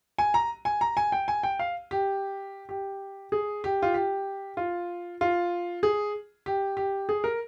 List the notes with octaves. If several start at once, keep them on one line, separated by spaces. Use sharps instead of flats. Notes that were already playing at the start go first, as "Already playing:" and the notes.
G#5
A#5
G#5
A#5
G#5
G5
G#5
G5
F5
G4
G4
G#4
G4
F4
G4
F4
F4
G#4
G4
G4
G#4
A#4